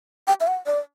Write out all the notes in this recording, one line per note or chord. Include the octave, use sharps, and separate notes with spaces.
G5
E5
F#5
D5